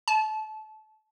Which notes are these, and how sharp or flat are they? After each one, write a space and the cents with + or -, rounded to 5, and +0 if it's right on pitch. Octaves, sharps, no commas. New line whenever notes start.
A5 -25